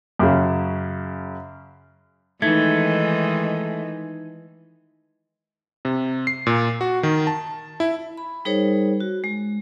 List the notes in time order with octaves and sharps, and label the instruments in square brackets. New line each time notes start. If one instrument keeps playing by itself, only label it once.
[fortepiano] F#2 C#3
[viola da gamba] D#3 E3 G#3 [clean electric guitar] A3 [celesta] D#4 G#6
[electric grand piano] C3
C7
A#2
F#4
D#3
A5
E4
[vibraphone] B5
G3 D#4 G#4 A#4 C5 C#5
F#4
G#3